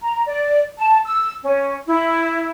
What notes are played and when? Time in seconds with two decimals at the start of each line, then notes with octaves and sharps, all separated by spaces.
0.01 A#5
0.26 D5
0.78 A5
1.06 E6
1.43 C#4
1.87 E4